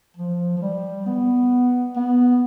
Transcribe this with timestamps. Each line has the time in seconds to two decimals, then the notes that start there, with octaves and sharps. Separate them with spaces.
0.17 F3
0.57 F3
0.62 G3
1.06 B3
1.96 B3